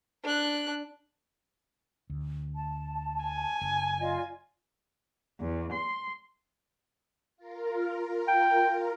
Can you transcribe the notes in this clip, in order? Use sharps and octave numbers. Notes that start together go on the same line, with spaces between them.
D4 F#6
D2
A5
G#5
F#1
F4 D5 D#5
E2
C6
F4 A#4
G5